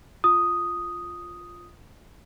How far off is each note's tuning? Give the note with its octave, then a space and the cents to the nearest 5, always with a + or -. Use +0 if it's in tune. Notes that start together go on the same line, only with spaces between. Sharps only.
F4 +0 D#6 +0